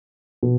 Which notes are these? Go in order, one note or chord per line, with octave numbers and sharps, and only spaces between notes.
B2